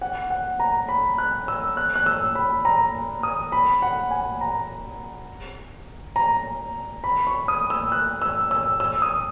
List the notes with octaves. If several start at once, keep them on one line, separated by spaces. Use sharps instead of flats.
F#5
F#5
A#5
B5
F#6
E6
F#6
F#6
E6
B5
A#5
D#6
B5
F#5
G#5
A#5
A#5
B5
C#6
D#6
E6
F#6
E6
E6
E6
D#6